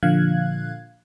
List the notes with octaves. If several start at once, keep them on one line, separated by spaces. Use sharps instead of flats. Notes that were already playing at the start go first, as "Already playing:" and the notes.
A#2 D3 F3 F5 F#6 G#6